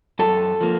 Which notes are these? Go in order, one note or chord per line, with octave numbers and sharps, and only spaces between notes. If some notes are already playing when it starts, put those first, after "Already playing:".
F#2 A4
F3 A#3